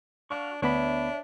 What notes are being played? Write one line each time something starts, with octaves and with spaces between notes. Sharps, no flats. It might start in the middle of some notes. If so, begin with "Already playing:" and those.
D4 F#4 F5 C#6
D2 B3 D4 C#5 E5 B5